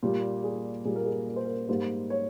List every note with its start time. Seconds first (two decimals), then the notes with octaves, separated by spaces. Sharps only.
0.03 A#2 G3 A#3
0.44 G#4
0.85 A#2 G3 A#3 G#4
0.96 A#4
1.06 G#4
1.27 A#4
1.36 C5
1.45 A#4
1.69 G#2 G3 A#3 C5
2.10 C#5